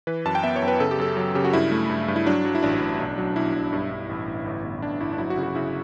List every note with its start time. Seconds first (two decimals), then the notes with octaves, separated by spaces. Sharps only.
0.07 E3 B4
0.25 F#2 A5
0.35 G5
0.43 B3 E5
0.56 C#5
0.62 F#2
0.68 B4
0.80 C#3 A4
0.91 G4
0.99 F#2 A4
1.17 F#3
1.35 C#3 G4
1.45 F#4
1.53 G2 E4
1.72 A3
1.90 G2
2.08 G2
2.16 E4
2.26 F#3 D4
2.45 F#3
2.55 E4
2.62 A1 D4
2.81 A1
2.99 B1
3.18 F#3
3.36 B1 E4
3.54 B1
3.73 G2
3.91 G2
4.09 A1
4.27 A1
4.46 G1
4.64 G1
4.82 G1 D4
5.00 G1 E4
5.13 D4
5.18 F#3 E4
5.30 F#4
5.37 C#3
5.43 F#4
5.55 C#3 E4